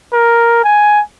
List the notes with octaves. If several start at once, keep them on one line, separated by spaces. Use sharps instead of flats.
A#4
G#5